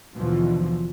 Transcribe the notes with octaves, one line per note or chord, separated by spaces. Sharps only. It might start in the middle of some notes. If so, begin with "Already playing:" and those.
D#2 B2 D3 E3 F3